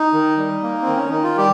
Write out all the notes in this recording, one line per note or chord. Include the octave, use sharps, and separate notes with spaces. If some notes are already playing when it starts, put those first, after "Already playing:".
Already playing: D#4
D#3
G3
A#3
C4
D#3
C#4
D#3 D#4
F4
G3 G4